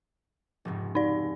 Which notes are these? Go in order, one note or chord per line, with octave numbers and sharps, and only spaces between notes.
F1 C#2 G#2
D#4 D5